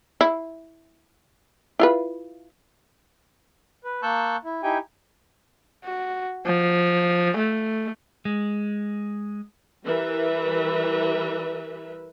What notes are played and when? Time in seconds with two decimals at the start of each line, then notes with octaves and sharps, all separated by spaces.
0.21 E4
1.79 E4 F4 B4
3.84 B4
4.02 A#3 A5 C#6 E6 F#6 G6
4.45 E4
4.63 D#4 E4 G4 G5 G#5
5.84 F#4
6.46 F3
7.37 A3
8.25 G#3
9.85 E3 G3 A#4 B4 E5